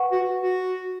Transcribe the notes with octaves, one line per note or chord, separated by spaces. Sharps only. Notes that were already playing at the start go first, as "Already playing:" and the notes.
Already playing: B4 F#5 C#6
F#4
F#4